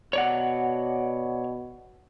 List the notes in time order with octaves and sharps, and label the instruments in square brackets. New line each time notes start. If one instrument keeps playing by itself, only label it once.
[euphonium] B2 [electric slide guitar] C#5 D5 F#5